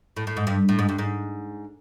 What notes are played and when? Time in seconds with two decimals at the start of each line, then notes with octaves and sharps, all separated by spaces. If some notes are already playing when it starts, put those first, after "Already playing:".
0.17 A2
0.27 A2
0.37 G#2
0.47 G2
0.69 A2
0.79 G#2
0.89 G2
0.99 G#2